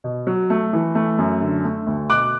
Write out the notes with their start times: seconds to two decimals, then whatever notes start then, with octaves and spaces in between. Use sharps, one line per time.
0.04 B2
0.27 F#3
0.50 A3
0.73 E3
0.95 A3
1.18 F#2
1.41 D3
1.64 A3
1.87 D2
2.10 B2 D6 F#6